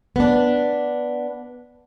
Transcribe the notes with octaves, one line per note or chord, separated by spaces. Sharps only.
B3 D4